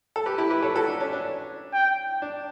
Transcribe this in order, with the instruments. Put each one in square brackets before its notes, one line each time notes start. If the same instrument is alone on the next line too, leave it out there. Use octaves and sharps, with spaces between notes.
[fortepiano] A4
G4 B4
E4 G4
G4 B4
A4 C#5
F#4 A4
D4
C#4
D4
[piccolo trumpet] G5
[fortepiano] D4